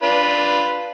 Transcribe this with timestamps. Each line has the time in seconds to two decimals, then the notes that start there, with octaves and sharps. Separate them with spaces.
0.03 D4 F4 B4